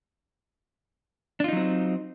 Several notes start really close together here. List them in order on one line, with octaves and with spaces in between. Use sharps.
D4 F4 D#4 F#3 C4